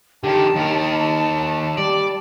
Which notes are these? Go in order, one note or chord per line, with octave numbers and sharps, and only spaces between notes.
D3 D#3 G4 A5
D#2 D#4 A#4
G3 D5